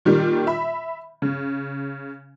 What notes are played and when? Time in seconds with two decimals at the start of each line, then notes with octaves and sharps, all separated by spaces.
0.05 A#2 D#3 G3
0.47 E5 B5
1.22 C#3